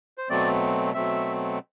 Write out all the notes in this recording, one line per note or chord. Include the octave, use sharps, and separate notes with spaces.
C5
B2 F#3 A3 C4 D5
B2 F#3 A3 C4 E5